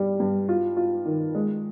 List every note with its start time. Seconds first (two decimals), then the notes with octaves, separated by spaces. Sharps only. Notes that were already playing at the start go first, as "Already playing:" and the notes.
Already playing: G2 G3
0.20 G2
0.49 F4
0.77 F4
1.05 D#3
1.35 G#3